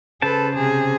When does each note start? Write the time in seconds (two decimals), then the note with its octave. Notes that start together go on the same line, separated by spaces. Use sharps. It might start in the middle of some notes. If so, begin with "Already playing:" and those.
0.22 C#3 A4 B4 C5 A5
0.56 C3 G#4